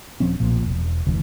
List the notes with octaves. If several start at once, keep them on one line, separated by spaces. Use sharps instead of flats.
D#1 F3 C4 C#4
B1 A#2 F3
E1
F1 D2 E3